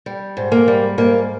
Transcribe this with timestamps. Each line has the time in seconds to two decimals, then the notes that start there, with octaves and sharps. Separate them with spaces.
0.06 G3
0.37 G#2
0.52 A#3
0.68 G3
0.98 G#2 A#3